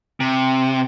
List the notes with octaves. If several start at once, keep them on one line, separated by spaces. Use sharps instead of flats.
C3